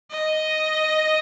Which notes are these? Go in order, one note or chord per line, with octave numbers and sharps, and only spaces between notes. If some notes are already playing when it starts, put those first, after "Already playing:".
D#5